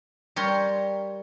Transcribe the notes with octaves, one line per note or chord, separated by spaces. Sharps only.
G3 A#4 C#5 C6